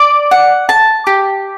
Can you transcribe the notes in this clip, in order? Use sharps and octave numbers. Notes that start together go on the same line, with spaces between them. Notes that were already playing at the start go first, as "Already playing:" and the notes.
Already playing: D5
F#5
A5
G4